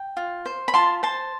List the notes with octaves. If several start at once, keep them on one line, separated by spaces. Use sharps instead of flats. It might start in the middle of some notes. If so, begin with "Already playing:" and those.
Already playing: G5
F4
C5
B5
F4 A5 C6
C5 A5 C6